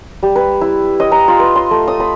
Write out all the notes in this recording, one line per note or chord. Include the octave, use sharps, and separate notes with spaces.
G3
B4
E4
D#5
A#5
F4
B4
C6
A3
D#6
B5